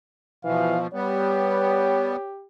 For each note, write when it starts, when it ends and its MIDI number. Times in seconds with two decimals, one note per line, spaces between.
0.45 0.87 47
0.45 0.75 52
0.45 0.87 53
0.45 0.79 77
0.93 2.16 55
0.93 2.16 59
0.93 2.47 67
0.93 2.31 73